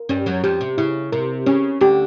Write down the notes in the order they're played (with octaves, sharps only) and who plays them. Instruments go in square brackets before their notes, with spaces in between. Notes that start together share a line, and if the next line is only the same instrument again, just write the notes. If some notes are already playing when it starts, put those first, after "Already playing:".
Already playing: [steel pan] A#4
[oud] G2 G3 [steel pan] C#4
[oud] F#2 F#3
[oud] F2 F3 [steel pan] G4
[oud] C3
[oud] C#3 [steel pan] E4
[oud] C3 [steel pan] A#4
[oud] C#3 [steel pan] C#4
[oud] D2 D3 [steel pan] G4